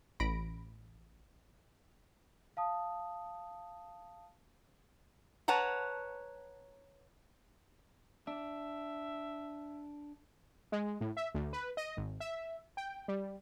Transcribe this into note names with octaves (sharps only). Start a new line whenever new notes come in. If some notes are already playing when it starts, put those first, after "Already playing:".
A1 B5 A#6 D7
F5 A5 D#6
B4 C#5 F#5 A5 A#5
D4 E5
G#3
A2
E5
D2
B4
D#5
G#1
E5
G5
G3